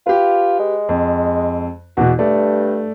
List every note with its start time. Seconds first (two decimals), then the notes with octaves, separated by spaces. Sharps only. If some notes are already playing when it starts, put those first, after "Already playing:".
0.07 F4 G4 B4
0.60 G#3
0.89 F2
1.97 E2 B2 F#4
2.19 G2 A3 D5